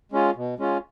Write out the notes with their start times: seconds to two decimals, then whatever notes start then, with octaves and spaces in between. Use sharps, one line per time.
0.12 G#3 C#4 F4
0.36 B2
0.58 G#3 C#4 F4